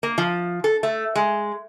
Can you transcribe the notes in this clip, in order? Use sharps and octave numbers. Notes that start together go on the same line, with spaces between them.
A#3
F3
A4
A3
G#3